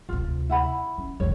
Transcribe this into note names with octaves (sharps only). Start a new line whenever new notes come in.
D2 C3 F4
E4 F#5 B5
C#4
E1 D#3 C#5